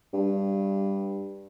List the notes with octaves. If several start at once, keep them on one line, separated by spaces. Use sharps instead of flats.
G2